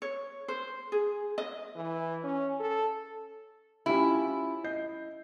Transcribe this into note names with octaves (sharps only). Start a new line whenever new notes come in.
C#5
C5
G#4
D#5
E3
C#4
A4
C#4 E4 F4 G4
D#5 G6 C7